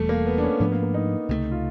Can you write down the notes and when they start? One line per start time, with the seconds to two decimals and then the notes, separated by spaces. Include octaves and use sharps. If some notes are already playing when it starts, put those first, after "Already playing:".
Already playing: E1 E2 B2 G3 A3
0.09 A#3
0.26 B3
0.38 D4
0.43 C#4
0.60 G#2 F3 A3 B3 D4
0.72 A#3
0.83 A#3
0.94 D#4
1.29 C#2 C3 F3 A3
1.51 F4